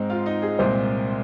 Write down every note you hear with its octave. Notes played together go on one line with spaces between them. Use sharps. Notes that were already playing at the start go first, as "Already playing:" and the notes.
Already playing: G#2 G#3 C4 D#4
F4 F5
D#4 D#5
G#4
C2 A#2 G#3 C4 C5